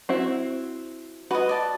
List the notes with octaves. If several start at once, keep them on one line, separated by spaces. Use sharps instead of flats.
C4 E4 F#4
F#4 B4 D#5
D5 A5